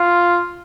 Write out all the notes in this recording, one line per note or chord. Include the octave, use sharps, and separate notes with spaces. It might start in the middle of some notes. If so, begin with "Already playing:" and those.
Already playing: F4